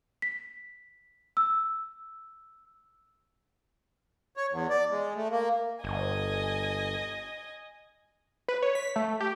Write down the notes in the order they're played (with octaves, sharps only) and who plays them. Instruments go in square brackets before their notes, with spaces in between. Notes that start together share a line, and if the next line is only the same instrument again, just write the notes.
[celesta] B6
E6
[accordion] C#5
E2
D5
G#3
A3
A#3
[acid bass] G1 [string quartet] D#5 G#5
[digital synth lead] B4
C#5
B6
A3
G4